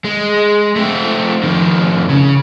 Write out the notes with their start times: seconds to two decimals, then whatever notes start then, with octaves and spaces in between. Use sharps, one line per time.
0.04 G#3
0.76 A3 C4
1.43 F2 D#3
2.09 C#3